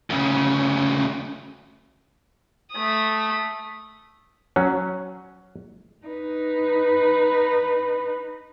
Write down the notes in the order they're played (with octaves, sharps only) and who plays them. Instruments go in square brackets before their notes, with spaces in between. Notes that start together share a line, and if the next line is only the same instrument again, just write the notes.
[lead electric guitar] D2 C#3
[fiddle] A3 D#6
[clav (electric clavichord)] F#3 C#4
[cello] D#4 B4